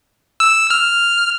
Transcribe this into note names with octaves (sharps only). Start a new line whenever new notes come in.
E6
F6